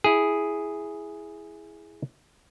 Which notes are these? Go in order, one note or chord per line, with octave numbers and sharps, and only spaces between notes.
E4 G#4